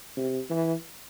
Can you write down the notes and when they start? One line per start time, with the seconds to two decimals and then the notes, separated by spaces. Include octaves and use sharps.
0.17 C3
0.50 E3